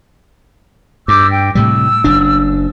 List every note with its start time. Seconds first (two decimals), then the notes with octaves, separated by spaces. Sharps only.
1.08 G2 D6 E6 G6
1.30 G5
1.55 A2 C3 G3 E6
2.04 F#1 F#2 D4